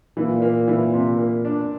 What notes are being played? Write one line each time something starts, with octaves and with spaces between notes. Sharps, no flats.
A#2 E3
A#3
E3
C3
A#3
D4